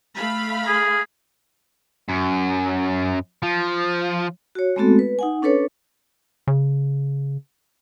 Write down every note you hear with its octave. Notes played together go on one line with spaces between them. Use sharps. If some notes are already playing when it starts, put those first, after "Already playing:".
A3 F5 B5
G#4
F#2
F3
F#4 C#5
G#3 A3 B3 C4 F#4 A4
B4
D#4 F#5 G#5
C#4 D4 A4 B4 C#5
C#3